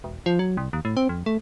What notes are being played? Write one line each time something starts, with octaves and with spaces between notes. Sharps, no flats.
E1
F3
F#3
C2
D#2
A2
C4
F2
A3